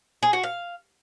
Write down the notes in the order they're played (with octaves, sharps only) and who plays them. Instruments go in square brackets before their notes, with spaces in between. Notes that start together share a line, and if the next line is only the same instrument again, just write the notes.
[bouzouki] G#4
F#4
F5